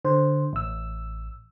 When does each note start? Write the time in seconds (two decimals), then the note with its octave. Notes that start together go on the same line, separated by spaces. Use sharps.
0.05 D3 C5
0.53 A1 E6